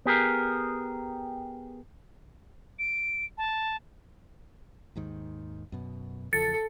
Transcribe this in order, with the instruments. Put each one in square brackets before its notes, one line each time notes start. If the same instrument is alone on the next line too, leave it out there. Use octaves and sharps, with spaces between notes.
[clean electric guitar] B3 G4 G#4 A#4
[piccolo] D7
A5
[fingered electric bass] D#2 G#2 D#3
F#2 B2
[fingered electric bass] E2 C#3 F3 [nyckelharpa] A4 [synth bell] A6 C#7